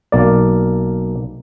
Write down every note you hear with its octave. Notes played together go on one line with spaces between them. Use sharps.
B1 A#3 D5